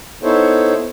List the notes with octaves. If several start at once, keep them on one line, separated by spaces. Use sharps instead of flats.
B3 D#4 E4 A4 C5 C#5